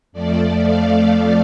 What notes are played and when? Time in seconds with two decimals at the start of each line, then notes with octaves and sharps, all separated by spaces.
0.12 F2 F3 A3 D5
0.65 F5